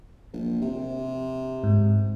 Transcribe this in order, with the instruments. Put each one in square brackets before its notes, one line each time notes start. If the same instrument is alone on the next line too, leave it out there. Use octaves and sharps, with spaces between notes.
[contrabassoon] A#1
C3
[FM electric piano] G#2